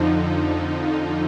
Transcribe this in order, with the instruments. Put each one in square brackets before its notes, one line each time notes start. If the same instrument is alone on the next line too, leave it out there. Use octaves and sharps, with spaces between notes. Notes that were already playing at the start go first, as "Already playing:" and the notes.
Already playing: [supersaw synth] F2 D3 F3 [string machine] D#4